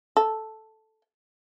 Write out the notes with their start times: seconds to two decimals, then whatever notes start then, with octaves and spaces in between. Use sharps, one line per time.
0.17 A4